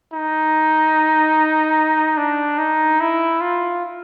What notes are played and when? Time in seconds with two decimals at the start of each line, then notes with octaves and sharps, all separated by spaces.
0.13 D#4
2.17 D4
2.58 D#4
3.00 E4
3.41 F4